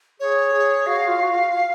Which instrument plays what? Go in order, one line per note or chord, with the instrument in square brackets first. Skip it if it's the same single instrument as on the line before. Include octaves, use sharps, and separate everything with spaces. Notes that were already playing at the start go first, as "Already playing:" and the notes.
[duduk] G#4 [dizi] C#5
[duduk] G#4
[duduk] F#4 [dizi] F5
[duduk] F4
F#4